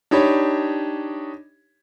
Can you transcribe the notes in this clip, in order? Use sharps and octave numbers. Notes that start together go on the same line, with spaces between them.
D4 D#4 G4 C#5 B5